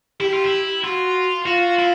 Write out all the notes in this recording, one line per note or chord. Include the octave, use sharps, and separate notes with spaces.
E4 G4
F4
E4
F4 F#4
F4 F#4
E4